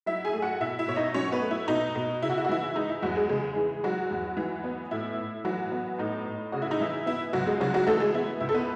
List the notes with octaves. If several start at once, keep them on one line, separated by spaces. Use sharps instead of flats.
F#3 E4 E5
G#4 G#5
A3
F#4 F#5
B2 E4 E5
E4 E5
B2 C#5
D#4 D#5
F#3 C#4 C#5
B3 B4
A3
E4
B2 D#4
B2
C#3 E4
F#4
E4
F#4
E3 E4
G#3 D#4
E4
E2 F#3 F#4
G#3 G#4
C#3 G#3 G#4
E3
F#3 G#3 F#4
E2
E3
B3
A2 E4
A2
E3 F#3 F#4
B3
A2 D#4
A2
C#3 F#4
E4
D#4
E3 E4
B3 E4
C#2 F#3 F#4
G#3 G#4
C#3 F#3 F#4
F#3 F#4
E3 A3 A4
G#3 G#4
B3 E4
C#2 E4
A4
B3 B4